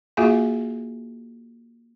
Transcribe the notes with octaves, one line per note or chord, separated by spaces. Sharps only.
A#3 F4 F#4 G#4 E5 G#5